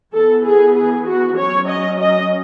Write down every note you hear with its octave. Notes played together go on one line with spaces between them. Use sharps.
E3 B3 A4
G#4
G#4
F#4
F#3 C#4 C#5
D#5
D#5